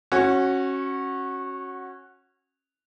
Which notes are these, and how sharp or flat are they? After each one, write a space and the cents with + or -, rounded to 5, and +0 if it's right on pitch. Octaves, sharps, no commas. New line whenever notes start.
C#4 -20 F#4 +0